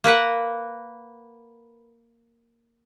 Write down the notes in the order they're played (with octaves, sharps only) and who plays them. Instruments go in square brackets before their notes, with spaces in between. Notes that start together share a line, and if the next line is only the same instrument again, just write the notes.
[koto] A#3 A#4 B4 F#5